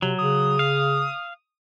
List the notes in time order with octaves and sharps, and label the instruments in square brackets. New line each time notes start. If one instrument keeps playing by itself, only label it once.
[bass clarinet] C3 [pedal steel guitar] F#3
[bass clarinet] C#3 [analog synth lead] D#6
[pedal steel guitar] F5